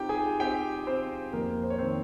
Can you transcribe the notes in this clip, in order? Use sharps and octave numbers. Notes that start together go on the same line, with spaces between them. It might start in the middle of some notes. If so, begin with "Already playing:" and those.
Already playing: C4 D#4 F4 G4 G5
G#4 G#5
C4 G4 G5
C4 C5
F2 A#3 A#4
C5
C#5
D#3 C4 C5